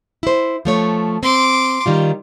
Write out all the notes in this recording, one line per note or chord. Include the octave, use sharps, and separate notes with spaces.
E4 C5
F3 A3 C#5
C4 C6 D6
D#3 G3 F4